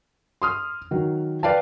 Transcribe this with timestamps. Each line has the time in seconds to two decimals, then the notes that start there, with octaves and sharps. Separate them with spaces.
0.42 C6 D#6 F6
0.91 D#3 F#3
1.43 B4 D5 F5 G5 A5